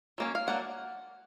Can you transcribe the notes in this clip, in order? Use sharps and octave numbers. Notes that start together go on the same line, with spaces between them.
F#3 A#3 C#4
F5
F#3 A#3 D4 F#5